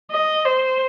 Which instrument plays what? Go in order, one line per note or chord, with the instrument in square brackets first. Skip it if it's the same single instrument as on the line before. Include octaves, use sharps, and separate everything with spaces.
[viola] D#5
C5